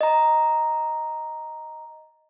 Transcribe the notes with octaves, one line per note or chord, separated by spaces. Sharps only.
D#5 A#5